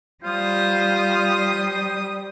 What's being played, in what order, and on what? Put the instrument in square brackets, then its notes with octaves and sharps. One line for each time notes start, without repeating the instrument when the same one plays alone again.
[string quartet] G3 D#6 [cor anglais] F4 [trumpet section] C5